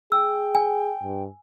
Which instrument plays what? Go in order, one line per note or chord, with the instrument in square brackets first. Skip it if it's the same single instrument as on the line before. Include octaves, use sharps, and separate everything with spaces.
[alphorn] G#4 [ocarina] G5 [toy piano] E6
[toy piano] G#5
[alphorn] G2